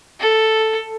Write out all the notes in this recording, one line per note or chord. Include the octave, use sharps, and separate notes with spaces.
A4